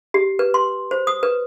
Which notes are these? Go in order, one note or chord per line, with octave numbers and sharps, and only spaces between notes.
G4
B4
C6
C5
D#6
B4